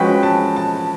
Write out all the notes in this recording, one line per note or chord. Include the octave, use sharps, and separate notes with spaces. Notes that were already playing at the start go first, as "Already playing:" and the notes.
Already playing: F3 G#3 C#4 F#4 B4 G5
A5
A5